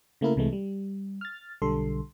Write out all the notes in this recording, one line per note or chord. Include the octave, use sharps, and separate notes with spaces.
C#3 A3 A#3 E4 A#4
C2 C3 E3 G#3 A3
G3
F6 A6
B1 D3 G3 A4 C6